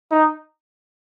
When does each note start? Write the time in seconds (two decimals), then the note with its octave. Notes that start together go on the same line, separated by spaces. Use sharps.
0.11 D#4